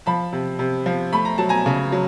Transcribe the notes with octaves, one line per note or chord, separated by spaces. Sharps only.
F3 A5 B5
C3
C3
F3
A3 B5
A#5
F#3 A5
G#5 A#5
C#3
F#3